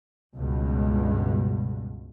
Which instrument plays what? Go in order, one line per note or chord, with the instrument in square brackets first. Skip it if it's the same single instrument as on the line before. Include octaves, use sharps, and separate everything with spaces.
[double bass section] C#2 G2 B2